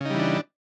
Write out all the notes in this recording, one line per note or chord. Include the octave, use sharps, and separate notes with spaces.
C#3 E3 G3 D4 D#4